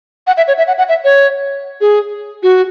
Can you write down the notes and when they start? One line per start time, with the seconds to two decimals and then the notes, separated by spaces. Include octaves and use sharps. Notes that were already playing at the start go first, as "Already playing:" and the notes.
0.27 F#5
0.37 E5
0.48 C#5
0.58 E5
0.68 F#5
0.78 F#5
0.89 E5
1.04 C#5
1.81 G#4
2.43 F#4